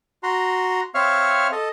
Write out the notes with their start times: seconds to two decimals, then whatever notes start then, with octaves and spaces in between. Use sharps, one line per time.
0.23 F#4 A#5 C6
0.95 C4 C#5 E5 F5 C#6 F6
1.52 A4 D#5